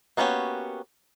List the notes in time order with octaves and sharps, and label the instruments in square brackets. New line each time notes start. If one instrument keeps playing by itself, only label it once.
[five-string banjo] A#3 B3 C#4 F#4 G4